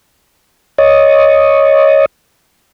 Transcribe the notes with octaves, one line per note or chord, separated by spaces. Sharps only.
C#5 D#5